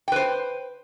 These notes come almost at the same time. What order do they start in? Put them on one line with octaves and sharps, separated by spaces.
G5 B4 C5